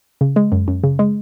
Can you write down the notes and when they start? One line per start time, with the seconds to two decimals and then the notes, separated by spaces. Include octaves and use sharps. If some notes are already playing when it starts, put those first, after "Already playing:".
0.21 C#3
0.36 G#3
0.52 F#2
0.68 F#2
0.84 C#3
0.99 G#3